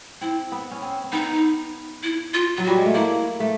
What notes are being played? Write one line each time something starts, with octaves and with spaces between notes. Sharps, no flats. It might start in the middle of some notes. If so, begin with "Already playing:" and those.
C4 E4
B3
C#4
C4
C4
B3 D#4
E4
F4
F#3 F4
G3 F#4
G#3
A3
A#3 E4
A3